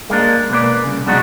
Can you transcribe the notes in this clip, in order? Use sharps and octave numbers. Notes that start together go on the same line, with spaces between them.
G#3 A#3 D4
B2 A#3 B4 D5
C2 C#3
F#2 B2 G#3 D4 D#4 F#4